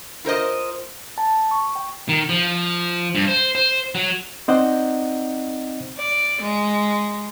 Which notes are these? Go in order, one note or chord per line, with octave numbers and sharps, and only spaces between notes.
F4 A#4 C5 D#5
A5
C#6
G5
D#3
F3
G2
C5
C5
F#3
C4 D#4 C5 D5 D#5 F#5
D5
G#3